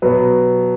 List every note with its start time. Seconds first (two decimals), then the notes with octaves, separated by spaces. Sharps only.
0.02 B2 F#3 B3